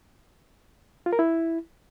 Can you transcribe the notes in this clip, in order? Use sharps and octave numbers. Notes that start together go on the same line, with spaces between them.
F4
A#4
E4